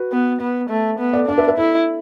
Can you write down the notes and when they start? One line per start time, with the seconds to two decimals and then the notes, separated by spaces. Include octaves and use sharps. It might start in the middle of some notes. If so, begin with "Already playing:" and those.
Already playing: F#4 B4
0.12 B3
0.41 B3
0.69 A3
0.99 B3
1.13 A4 D5
1.28 D4 D5
1.38 B4 E5
1.48 B4 E5
1.57 E4 A4